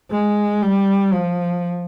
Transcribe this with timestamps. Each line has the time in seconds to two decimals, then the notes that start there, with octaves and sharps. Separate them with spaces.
0.11 G#3
0.62 G3
1.13 F3